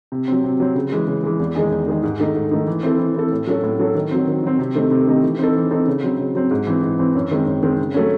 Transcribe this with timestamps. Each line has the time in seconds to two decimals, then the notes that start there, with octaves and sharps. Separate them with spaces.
0.12 C3
0.28 F#3 C4
0.44 C3
0.60 F#3 C4
0.76 C#3
0.92 E3 G#3
1.07 C#3
1.23 E3 G#3
1.39 E2
1.55 D#3 G#3 D#4 G#4
1.71 E2
1.87 D#3 G#3 D#4 G#4
2.03 G#2
2.20 D#3 A3 D#4
2.35 G#2
2.51 D#3 A3 D#4
2.67 E3
2.83 C4 E4 A4
2.99 E3
3.15 C4 E4 A4
3.32 A2
3.47 F#3 C#4 F#4 A4
3.63 A2
3.79 F#3 C#4 F#4 A4
3.95 D#3
4.11 F#3 C4
4.27 D#3
4.43 F#3 C4
4.59 C3
4.75 D#3 A3 C4 D#4
4.91 C3
5.07 D#3 A3 C4 D#4
5.23 E3
5.39 C4 D#4 A4
5.55 E3
5.71 C4 D#4 A4
5.87 C#3
6.03 F#3 C4
6.19 C#3
6.35 F#3 C4
6.51 G#2
6.67 E3 C4
6.83 G#2
6.99 E3 C4
7.15 F#2
7.31 D#3 G#3 C4
7.47 F#2
7.63 D#3 G#3 C4
7.79 C#3
7.94 F#3 A3 C#4